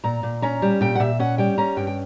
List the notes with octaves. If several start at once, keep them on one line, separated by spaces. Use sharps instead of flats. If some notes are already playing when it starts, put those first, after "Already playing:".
A#2 A#5
A#2
C#4 A#5
G3
A#2 G5
F#5
A#2 E5
C#4 F#5
G3 G5
C#4 A#5
G2 G5
G5